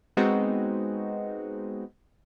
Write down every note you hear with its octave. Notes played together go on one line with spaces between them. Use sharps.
G#3 B3 C4 D#4 F#4